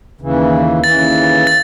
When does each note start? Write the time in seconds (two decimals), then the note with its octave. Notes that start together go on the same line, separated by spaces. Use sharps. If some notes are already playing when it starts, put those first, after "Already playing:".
0.21 D#2 C#3 E3
0.83 D#2 C#3 E3 A6
1.47 A6